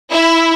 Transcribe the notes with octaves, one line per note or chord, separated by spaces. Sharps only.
E4